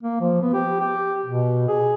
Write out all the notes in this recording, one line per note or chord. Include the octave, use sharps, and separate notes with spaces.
A#3
F3
B3
G4
G4
B2
G#4